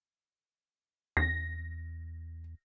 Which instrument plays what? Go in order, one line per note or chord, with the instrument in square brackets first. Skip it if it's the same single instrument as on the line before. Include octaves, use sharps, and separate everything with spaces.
[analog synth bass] E2 [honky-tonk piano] A#6